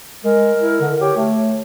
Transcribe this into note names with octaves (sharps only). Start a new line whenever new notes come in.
G#3 A#4
E4
D3
G4 C#5
A3